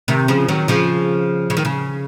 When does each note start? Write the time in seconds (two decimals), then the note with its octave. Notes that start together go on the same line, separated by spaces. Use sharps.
0.08 C3 D#3
0.28 C#3 F3
0.48 D#3 F#3
0.68 C#3 F3
1.50 C#3
1.57 D#3
1.65 C#3